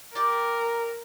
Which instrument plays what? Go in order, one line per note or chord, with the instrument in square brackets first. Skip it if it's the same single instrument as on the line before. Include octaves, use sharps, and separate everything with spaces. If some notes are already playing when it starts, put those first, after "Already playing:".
[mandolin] G4 D5 [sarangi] A#4